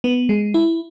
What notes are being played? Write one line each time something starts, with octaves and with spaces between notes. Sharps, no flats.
B3
G#3
E4